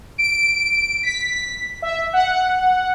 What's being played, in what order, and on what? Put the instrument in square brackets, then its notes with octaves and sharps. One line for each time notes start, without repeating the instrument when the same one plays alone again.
[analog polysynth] D7
B6
E5
F#5